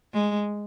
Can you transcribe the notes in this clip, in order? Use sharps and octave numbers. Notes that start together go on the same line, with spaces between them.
G#3